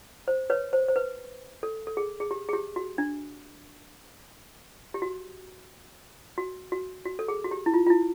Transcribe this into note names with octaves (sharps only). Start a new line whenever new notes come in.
C5
B4 C#5
C5
C5
B4
A4
A4
G#4
G#4
G4
G#4
G4
F#4
D4
G4
F#4
F#4
F#4
F#4
A4
G#4
F#4
G4
E4
F4
F4
E4